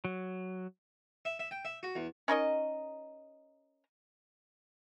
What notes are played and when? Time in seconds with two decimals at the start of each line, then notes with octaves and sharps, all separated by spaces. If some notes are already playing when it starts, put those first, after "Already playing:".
0.05 F#3
1.25 E5
1.39 E5
1.51 G5
1.65 E5
1.83 F#4
1.96 E2
2.28 C#4 D#4 A#4 D#5